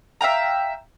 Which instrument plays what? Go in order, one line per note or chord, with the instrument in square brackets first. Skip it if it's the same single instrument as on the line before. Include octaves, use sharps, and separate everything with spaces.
[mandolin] E5 F5 G5 A#5